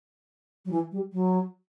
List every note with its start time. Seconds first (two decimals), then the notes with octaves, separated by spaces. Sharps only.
0.65 F#3
0.71 E3
0.92 G3
1.13 F#3